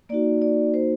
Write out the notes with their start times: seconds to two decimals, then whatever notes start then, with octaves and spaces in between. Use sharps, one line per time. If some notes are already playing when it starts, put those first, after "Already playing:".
0.09 A#3 D#4 F#4 D5
0.42 D5
0.74 C5